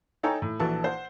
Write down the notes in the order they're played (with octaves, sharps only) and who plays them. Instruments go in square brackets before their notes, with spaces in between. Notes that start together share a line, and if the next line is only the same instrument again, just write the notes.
[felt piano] D#4 A4 C#5 G5 G#5 A#5
A2
A#1 E3 F#4 A4 A5
C5 F#5